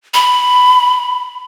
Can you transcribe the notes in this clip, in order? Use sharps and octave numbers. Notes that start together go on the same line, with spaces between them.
B5